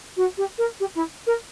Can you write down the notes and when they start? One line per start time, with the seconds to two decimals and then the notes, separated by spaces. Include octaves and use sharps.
0.16 F#4
0.37 G4
0.58 A#4
0.80 G4
0.95 E4
1.26 A#4